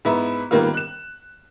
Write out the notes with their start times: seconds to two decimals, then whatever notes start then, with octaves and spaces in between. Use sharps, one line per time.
0.05 G#2 B3 E4 E5
0.51 G#2 D#3 G3 A#3 B3 F4
0.74 F#6 E7